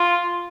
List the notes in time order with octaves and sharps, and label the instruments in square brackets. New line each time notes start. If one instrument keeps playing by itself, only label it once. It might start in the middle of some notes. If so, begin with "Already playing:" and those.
Already playing: [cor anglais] F4